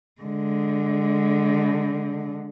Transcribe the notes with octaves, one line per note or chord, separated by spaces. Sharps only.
D3 G#3